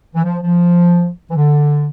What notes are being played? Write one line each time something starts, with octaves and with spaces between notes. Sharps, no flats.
E3
F3
F3
E3
D3